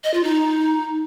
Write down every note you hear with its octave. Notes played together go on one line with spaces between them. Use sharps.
D#5
F4
D#4